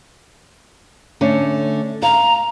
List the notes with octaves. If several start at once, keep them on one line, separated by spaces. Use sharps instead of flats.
D3 A3 C#4
F5 A#5